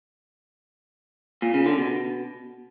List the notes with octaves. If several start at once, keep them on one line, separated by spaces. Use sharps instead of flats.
A#2
C#3
D3
B2